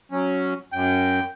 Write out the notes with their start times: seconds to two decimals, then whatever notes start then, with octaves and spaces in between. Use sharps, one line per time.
0.12 F#3 C#4
0.73 F#2 G5